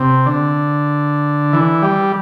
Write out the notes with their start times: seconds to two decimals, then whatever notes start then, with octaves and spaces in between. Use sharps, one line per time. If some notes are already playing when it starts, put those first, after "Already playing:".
Already playing: C3
0.26 D3
1.53 E3
1.82 G3